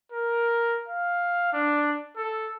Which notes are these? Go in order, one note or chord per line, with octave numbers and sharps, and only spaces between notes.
A#4
F5
D4
A4